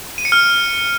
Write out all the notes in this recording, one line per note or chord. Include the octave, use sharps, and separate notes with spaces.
D#7
C#7
F6